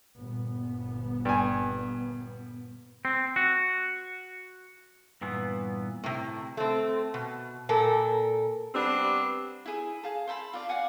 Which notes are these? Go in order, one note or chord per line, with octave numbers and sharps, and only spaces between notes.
G1 A#2 B3
G2 G#5
C4
F#4
G2 A#2 E3 B3
A2 C3
A3 C4
B2
A#2 A4 A#4
G3 B3 C4 D4
E4 G#4
G#4 F5 A5
C5 E5 A5 B5
F4 D5 F5
D5 F5 F#5 G#5